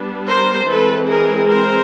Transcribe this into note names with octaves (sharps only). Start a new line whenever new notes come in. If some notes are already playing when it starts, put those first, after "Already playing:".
Already playing: G3 B3 D4
A#4 C5
E3 G#3 C4 A4 B4
G#4 A#4
A#4 C5